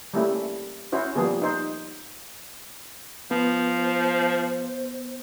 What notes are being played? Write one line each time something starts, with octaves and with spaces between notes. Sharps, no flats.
G3 A3 A#3 C#4 E4
C#4 E4 F#4 C5
F3 G3 A#3 B3 G#4
D#4 C5
F3 B3 C5